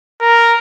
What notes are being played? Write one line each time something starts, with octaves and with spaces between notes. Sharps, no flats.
A#4